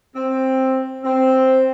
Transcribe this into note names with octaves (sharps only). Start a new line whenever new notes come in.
C4
C4